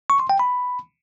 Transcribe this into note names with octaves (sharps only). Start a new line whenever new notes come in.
C#6
C6
G5
B5